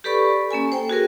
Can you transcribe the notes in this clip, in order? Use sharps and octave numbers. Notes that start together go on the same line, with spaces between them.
G4 A4 B4 D5 B5 C#6
A#3 C#4 A4 G#5
C5 G5
F#4 G#4 A#4